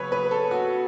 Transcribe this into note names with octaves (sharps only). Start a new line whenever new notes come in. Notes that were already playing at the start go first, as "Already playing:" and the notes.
Already playing: C#3 F#3 B3 B4 C#5
B4
A4
F#4